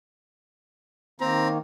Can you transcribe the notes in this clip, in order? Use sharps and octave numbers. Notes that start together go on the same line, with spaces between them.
D#3 A#3 C4 A#5